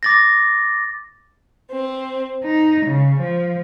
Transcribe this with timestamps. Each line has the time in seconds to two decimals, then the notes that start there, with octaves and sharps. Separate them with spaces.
0.03 D6 A6 A#6
1.72 C4
2.45 D#4
2.87 C#3
3.21 F3